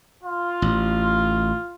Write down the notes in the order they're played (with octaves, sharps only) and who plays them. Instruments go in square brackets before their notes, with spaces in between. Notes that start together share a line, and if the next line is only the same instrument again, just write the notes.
[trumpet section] F4
[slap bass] A1